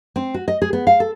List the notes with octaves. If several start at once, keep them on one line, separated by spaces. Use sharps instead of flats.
C4
F#4
D#5
G#4
B3
F5
A4